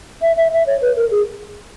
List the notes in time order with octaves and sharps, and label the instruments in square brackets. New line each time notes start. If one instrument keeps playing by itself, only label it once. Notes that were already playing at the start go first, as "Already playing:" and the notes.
[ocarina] E5
E5
E5
C#5
B4
A#4
G#4